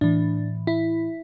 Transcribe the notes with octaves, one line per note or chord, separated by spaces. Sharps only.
A2 E3 D4
E4